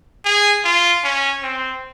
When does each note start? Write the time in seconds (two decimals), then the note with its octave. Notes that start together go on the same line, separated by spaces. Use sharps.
0.25 G#4
0.64 F4
1.04 C#4
1.43 C4